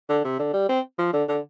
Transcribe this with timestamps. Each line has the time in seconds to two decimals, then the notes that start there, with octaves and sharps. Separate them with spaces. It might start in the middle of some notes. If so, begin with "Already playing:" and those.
0.09 D3
0.24 C3
0.39 D3
0.53 G3
0.69 C4
0.98 F3
1.13 D3
1.29 D3